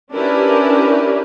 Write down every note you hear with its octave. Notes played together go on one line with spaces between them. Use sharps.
C#4 D4 E4 G4 A#4 B4